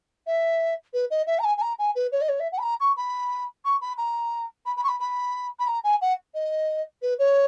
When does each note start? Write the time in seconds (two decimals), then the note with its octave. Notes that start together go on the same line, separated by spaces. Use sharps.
0.26 E5
0.93 B4
1.10 D#5
1.26 E5
1.39 A#5
1.44 G#5
1.57 G#5
1.61 A#5
1.78 G#5
1.95 B4
2.11 C#5
2.21 D#5
2.28 C#5
2.39 E5
2.52 F#5
2.58 B5
2.62 A#5
2.80 C#6
2.96 B5
3.64 C#6
3.81 B5
3.97 A#5
4.65 B5
4.76 B5
4.83 C#6
4.88 B5
5.00 B5
5.59 B5
5.67 A#5
5.83 G#5
6.01 F#5
6.34 D#5
7.01 B4
7.18 C#5